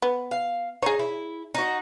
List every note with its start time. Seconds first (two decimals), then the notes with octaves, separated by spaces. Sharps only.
0.02 B3
0.31 F5
0.83 D#4 G#4 C#5
0.99 E4
1.55 D#4 F#4